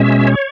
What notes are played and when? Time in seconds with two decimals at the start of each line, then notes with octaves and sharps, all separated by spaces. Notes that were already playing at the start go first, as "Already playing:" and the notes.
Already playing: B2 G#3 C#4 E5
0.27 C#5